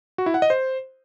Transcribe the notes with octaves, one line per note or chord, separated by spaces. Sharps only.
F#4
E4
F#5
D#5
C5